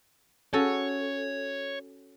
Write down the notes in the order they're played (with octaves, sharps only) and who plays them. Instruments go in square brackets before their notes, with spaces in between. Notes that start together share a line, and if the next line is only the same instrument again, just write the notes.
[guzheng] C#4 F#4 A4 [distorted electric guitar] C#5